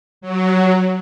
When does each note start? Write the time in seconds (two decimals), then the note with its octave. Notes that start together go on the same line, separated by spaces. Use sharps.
0.21 F#3